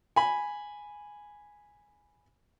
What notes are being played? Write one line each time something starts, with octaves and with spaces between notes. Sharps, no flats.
G#5 B5